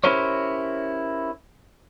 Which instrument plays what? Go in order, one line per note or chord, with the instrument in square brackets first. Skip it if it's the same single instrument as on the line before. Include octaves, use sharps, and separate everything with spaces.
[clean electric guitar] C#4 E4 G4 A#4 C5 C#5